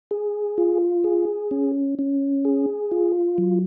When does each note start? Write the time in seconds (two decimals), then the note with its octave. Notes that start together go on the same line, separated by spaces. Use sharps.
0.11 G#4
0.58 F4
1.04 G#4
1.51 C#4
1.99 C#4
2.45 G#4
2.91 F4
3.38 F#3